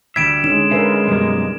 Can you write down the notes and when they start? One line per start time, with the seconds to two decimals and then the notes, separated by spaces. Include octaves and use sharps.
0.16 D2 G3 E5 G#6 D7 E7
0.44 D3 G#3 C#4 D#4 E7
0.72 C#3 A#4 B4 E5
1.08 B1 F#2 G3 A#3